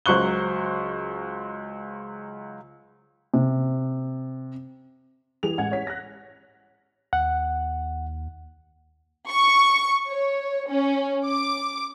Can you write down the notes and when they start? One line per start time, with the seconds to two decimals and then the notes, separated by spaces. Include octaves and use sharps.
0.06 C#2 F#3 C5 C#6 F#6 G7
3.34 C3
5.43 E3 G4 G#4 F7
5.58 A1 G#3 F#5 G#5 G#6
5.72 C#5 B6
5.87 F#6 A#6
7.13 D#2 F#5
9.29 C#6
10.10 C#5
10.69 C#4
11.25 D6